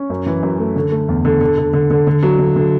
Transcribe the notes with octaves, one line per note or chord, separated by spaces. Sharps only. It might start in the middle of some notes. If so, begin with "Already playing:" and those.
Already playing: C#4
F#2
E3
F#2
A3
D3
A3
E2
D3
D3
D3
D3
D3
D3
F#3
D3
D3